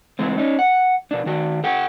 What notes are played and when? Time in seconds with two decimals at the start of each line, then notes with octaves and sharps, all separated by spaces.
0.19 E3 G#3 C4
0.38 C#4 D#4
0.59 F#5
1.11 B2 D4
1.26 D#3 F#4
1.64 G#4 F#5 G5